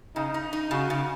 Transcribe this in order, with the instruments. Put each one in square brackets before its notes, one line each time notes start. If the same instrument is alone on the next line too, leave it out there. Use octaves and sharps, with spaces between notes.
[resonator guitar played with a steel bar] C#3 [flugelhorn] D#4
[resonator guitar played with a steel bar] D#4
D#4
[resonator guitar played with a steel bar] C#3 [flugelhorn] F#4
[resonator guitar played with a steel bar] C#3